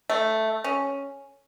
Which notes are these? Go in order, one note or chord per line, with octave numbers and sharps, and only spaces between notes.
A3
C#4